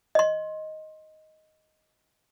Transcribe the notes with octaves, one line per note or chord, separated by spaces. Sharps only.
D#5 C6